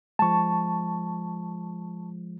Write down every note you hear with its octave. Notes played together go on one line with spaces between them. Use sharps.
F3 G#3 A5 C#6